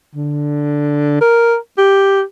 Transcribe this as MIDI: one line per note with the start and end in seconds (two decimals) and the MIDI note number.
0.15 1.17 50
1.21 1.56 70
1.78 2.22 67